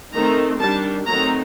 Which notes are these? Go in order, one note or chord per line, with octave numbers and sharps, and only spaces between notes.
D#3 A3 C4 D#4 A#5
D#3 G3 D4 A5
D#3 F#3 A3 C4 D#4 A#5